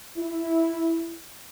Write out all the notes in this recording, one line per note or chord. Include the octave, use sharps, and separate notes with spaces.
E4